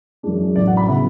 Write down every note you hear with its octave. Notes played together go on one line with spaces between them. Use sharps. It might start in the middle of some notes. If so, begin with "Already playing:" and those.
F#2 E3 G#3 D4
A1 A2 F#3 D5
F#5
B5
C#3 F#3 B3 E4 E5